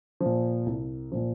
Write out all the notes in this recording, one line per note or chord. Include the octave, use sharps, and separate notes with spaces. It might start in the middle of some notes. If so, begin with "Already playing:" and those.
F3
A#2
C2
A#2 F3